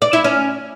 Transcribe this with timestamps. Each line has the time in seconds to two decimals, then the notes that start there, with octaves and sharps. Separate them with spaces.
0.02 D5
0.13 E4
0.24 C#4